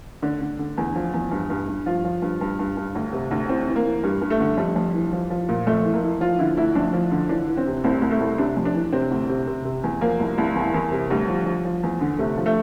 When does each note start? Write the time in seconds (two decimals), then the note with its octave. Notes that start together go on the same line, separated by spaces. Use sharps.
0.22 D3 D4
0.41 D3
0.59 D3
0.78 E2
0.95 F3
1.14 E2
1.31 G2
1.50 G2
1.68 G2
1.86 F3 F4
2.04 F3
2.22 G2
2.41 G2
2.59 G2
2.77 G2
2.95 D2
3.13 C3
3.31 D2
3.48 E3 C4
3.68 E3
3.76 A#3
3.85 E3
4.03 G2 G3
4.21 G2
4.30 A3
4.40 D3
4.57 F2 G3
4.76 F2
4.94 E3
5.13 F3
5.30 F3
5.49 A#2
5.67 F2 A3
5.85 E3
5.93 A#3
6.03 E3
6.21 F3 F4
6.39 D3 E4
6.57 D2 E4
6.75 F2 D4
6.93 F3
7.12 D3
7.29 E3 D4
7.48 E3
7.57 C4
7.66 C3
7.84 C2 C4
8.02 C2
8.11 A3
8.20 C2
8.38 C3 D4
8.57 F2
8.65 D4
8.74 E3
8.93 C3 C4
9.11 D2
9.29 C3
9.47 C3
9.65 C3
9.84 E2
10.01 F3 A#3
10.20 C2
10.38 C2
10.55 E2
10.74 E2
10.92 C3
11.10 D2 G3
11.28 F3
11.46 F3
11.65 F3
11.83 E2
12.01 D3
12.19 C3 A3
12.37 F3
12.46 A3